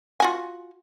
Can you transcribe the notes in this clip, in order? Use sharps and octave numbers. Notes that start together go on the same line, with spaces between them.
F4 F#4 G#5